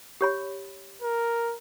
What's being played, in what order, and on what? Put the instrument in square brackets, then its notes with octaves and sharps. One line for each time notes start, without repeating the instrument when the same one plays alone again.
[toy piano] G4 C#5 B5
[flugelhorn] A#4